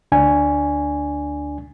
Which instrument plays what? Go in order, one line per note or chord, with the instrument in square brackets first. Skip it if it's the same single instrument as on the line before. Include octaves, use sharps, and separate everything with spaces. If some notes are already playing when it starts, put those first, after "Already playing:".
[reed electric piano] D2 D4 G#5